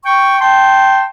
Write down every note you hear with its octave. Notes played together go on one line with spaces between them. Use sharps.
G5 C#6
G5 A5 C6